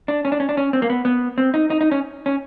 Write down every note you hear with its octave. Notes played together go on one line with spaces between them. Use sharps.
D4
C#4
D4
C#4
D4
C#4
C4
A#3
B3
B3
C4
D#4
D#4
D#4
C#4
C#4